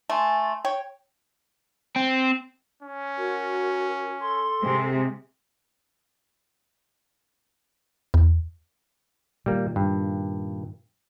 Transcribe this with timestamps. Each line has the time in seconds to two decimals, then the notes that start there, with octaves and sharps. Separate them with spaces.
0.10 A3 G#5 C6 A6
0.65 C#5 G5
1.96 C4
2.83 C#4
3.17 F#4 A#4
4.20 A4 C6
4.64 C3 G#3 C4
8.14 E2
9.46 A#2 D#3 G3 A#3
9.76 G2